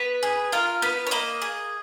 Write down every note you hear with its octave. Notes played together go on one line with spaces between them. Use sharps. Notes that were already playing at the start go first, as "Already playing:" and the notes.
Already playing: B3 B4
G#4
F4 A#4
B3 B4
C#5
A#3 D#5
G#4